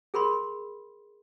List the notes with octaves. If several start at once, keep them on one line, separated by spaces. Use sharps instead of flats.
G#4 A#4 B5 C6